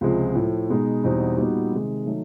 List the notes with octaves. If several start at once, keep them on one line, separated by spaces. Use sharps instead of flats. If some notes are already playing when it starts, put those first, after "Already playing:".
C#2 C3 F3 G#3
A2 F3 A3
B2 G#3 B3 D#4
E2 B2 G3 C4 D#4
A#2 G3 B3 D#4 F#4
C3 D#3 G#3
D#3 F#3 A3